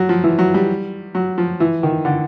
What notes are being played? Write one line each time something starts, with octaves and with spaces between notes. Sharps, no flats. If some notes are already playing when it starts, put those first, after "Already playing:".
Already playing: F#3
F3
E3
F#3
G3
F#3
F3
E3
D#3
D3